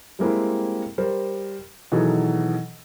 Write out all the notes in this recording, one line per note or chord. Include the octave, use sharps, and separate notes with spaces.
G3 G#3 A#3 C4 E4
G3 A#4 C5
B2 D#3 E3 F#3 G#4 A4